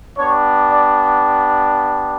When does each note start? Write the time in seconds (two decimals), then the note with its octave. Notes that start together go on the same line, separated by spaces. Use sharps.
0.17 B3 D4 G4 C#5
0.71 D5